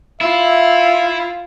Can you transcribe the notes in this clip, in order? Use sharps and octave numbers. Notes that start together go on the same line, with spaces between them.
E4 F4 E5